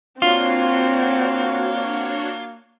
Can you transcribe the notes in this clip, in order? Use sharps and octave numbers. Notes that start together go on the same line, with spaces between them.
A#3 C4 D4 F4 F#4 C#5